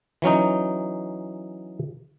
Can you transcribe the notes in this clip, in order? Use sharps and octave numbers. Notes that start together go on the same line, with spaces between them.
E3 F#3 C#4 D#4